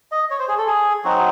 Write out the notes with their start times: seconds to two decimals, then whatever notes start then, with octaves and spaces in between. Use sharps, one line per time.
0.12 D#5
0.31 C#5
0.39 C5
0.48 G#4
0.58 A4
0.67 G#4
1.04 F#3 C4 D#4 F#4